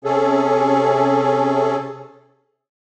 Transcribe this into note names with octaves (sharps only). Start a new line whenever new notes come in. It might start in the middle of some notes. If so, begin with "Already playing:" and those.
C3 C#4 G#4 A4